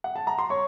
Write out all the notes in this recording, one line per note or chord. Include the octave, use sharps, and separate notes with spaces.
F#5
A5
A#5
C6
C#5 C#6